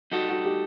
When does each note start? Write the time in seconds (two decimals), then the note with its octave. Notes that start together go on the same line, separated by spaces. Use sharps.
0.12 G3 D#4 F#4 A4 D#5
0.29 F#4
0.45 G4